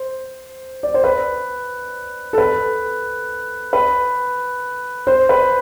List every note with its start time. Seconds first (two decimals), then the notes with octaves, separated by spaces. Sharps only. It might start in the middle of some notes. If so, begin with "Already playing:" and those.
Already playing: C5
0.83 D5
0.94 C5
1.04 B4
2.33 A4
2.38 B4
3.73 B4
5.07 C5
5.29 B4